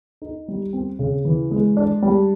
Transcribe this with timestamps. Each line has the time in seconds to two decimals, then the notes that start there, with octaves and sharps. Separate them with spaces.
0.22 D#4
0.48 G3
0.73 C4
0.99 C#3
1.25 E3
1.51 G#3
1.77 D4
2.02 G3